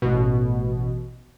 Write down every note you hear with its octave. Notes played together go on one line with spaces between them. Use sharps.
A1 B2